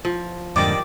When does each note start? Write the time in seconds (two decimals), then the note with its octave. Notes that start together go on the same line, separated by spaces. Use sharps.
0.05 F3
0.56 F2 G#2 D3 D#3 G3 D6 A6 D7